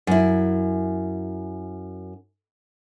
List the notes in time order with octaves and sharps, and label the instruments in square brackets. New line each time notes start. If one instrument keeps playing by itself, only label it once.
[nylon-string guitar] F#2 E4